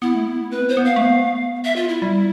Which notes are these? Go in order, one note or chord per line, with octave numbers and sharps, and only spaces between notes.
B3 E4
A3
B3
C4 B4
B3
C5
B3
F5
A3
B3
E5
F4
E4
G3